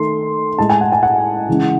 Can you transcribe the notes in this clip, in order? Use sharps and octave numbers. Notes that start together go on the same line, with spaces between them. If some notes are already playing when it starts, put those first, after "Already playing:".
Already playing: D#3 A3 C6
A2 G#3 A5
G#5
F#5
G#5
F#5
C#3 E3 G#3